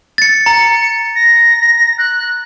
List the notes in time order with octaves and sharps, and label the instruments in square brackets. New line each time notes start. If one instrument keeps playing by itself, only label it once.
[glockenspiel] A6 C#7
[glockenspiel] A#5 [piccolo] C#7
[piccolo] A#6
F#6